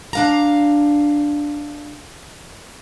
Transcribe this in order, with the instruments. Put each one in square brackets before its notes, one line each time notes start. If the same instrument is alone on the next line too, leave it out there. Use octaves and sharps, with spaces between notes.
[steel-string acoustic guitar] D4 F5 A#5